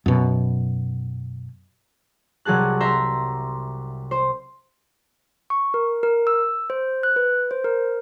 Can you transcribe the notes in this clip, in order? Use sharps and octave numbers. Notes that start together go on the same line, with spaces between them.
F#2 B2
C2 F#3 G#4 A5 F#6
E5 A#5 C6 G6
C5
C#6
A#4
A#4
E6
C5
F#6
B4
C5
A#4